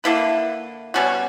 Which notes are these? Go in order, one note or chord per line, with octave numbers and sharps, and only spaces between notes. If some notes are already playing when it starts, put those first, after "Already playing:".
D3 A#3 E4 B4
B2 G3 C#4 F#4